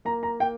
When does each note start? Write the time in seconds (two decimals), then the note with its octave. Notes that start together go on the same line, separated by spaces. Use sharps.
0.05 A#3 A#5
0.23 A#5
0.40 A#3 G5